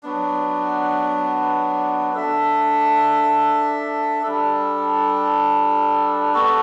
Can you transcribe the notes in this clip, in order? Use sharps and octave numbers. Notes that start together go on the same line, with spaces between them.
F#3 B3 D4
D4 A4 E5
G3 D4 A4
B3 F#4 A4